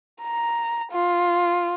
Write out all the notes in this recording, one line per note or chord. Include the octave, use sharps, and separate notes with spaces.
A#5
F4